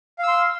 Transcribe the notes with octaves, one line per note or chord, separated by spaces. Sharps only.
F5 C6 E6